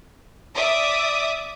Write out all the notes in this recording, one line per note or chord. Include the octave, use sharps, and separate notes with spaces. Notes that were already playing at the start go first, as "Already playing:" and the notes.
D5 E5 D6 D#6